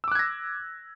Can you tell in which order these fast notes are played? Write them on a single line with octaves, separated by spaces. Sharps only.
E6 D6 F#6 G#6 A#6